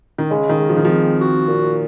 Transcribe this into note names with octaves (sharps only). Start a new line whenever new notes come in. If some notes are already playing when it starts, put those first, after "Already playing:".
D#3
C#3 G#3
D#3
G#3
F3
D#3
F3 C4
F#4
A#2